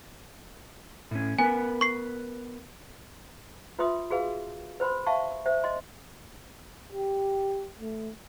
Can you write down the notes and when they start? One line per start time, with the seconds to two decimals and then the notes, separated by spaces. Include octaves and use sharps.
1.11 A2 C#4
1.39 B3 A#4 B4 G#5
1.81 C#6 C7
3.79 F4 B4 E5 C6 D#6
4.10 F#4 G#4 B4 F5
4.80 B4 C5 B5 C6
5.06 E5 F5 A5 C#6
5.46 C5 E5
5.64 D#5 C6
6.92 G4
7.80 A3